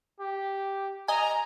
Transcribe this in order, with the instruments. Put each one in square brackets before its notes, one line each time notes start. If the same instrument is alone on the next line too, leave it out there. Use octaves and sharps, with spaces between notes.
[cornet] G4
[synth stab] D#5 G#5 [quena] A#5